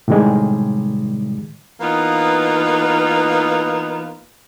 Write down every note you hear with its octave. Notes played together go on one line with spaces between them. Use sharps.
A2 C3 D#3 G3 G#3
E3 A#3 B3 D#4 F4 B4